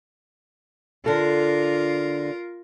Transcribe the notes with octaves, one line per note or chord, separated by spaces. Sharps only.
D3 F4 A4 A#4